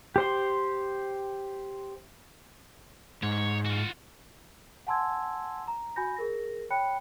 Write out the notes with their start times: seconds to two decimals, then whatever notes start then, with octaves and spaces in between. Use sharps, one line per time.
0.16 G4 C5 C6
3.23 G#2 C#5
3.65 F4 F#4
4.87 F#5 G#5 A5 C6 E6 G#6
5.68 A#5
5.96 F#4 G#5 B5 G6 A#6
6.16 G#4 A#4 A#6
6.70 C#5 G5 B5 F#6 C#7